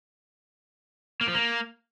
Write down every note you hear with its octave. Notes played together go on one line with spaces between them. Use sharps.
A#3
F3
A#3